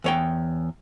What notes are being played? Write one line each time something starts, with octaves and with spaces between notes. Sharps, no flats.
E2 C#5 G5